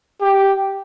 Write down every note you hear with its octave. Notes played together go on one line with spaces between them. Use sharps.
G4